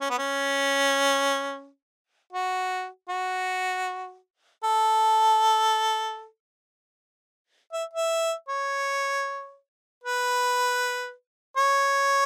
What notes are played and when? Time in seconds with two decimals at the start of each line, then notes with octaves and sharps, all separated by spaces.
0.01 C#4
0.10 B3
0.18 C#4
2.33 F#4
3.09 F#4
4.64 A4
7.73 E5
7.94 E5
8.49 C#5
10.04 B4
11.57 C#5